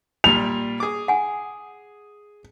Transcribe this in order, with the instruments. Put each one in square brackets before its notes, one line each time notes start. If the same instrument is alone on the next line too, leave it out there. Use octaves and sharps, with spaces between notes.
[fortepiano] A#2 G3 [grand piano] F7
[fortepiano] G#4 D6
[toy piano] F#5 G#5